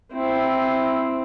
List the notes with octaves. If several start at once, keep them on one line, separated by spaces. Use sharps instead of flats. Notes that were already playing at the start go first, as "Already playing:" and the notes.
C4 E4